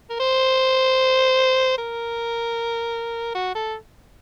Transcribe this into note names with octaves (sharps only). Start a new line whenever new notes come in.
A#4
C5
A#4
F#4
A4